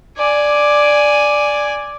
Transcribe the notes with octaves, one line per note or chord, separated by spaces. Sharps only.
D5 G#5